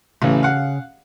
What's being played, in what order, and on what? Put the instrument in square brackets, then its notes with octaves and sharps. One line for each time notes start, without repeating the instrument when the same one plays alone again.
[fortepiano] A1 E3 [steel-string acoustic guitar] C#3
[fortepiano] F5 F#5